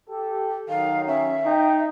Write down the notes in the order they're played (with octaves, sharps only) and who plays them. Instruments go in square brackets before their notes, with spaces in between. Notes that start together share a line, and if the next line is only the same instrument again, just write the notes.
[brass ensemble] G4 A4
[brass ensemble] D#3 F#3 D#4 [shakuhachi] F5
[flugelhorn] C#4 [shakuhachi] E5
[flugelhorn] D#4 [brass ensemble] G5